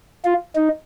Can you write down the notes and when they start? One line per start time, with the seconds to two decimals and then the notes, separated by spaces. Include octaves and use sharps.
0.25 F4
0.55 D#4